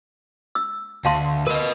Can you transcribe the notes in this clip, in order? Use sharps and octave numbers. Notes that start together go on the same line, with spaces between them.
E6
D2 F5 A5 C6
A#4 B4 D#5